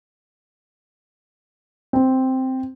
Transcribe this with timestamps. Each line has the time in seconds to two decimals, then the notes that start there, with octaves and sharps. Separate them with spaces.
1.93 C4